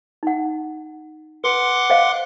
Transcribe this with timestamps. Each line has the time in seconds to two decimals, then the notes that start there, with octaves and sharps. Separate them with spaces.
0.23 D#4 F#5
1.44 B4 F#5 C6 D6
1.90 C5 D#5 F5